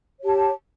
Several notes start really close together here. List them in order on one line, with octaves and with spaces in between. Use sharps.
C#5 G4 A5